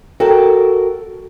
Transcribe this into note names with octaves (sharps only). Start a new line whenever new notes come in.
F#4 A4 A#4 G5 A5